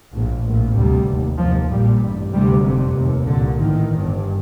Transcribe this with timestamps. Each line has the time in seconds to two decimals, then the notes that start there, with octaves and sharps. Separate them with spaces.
0.13 A#1 A2
0.44 A#1 A2
0.75 D2 C3 G3
1.07 F1 D#2
1.38 F1 D#2 F3
1.70 A#1 A#2 G3
2.01 A1
2.06 G2
2.32 D2 C3 G3
2.63 F1 F2 C3
2.95 F1 D#2
3.26 C2 A#2 D3
3.58 A1 A2 D#3
3.90 G1 G2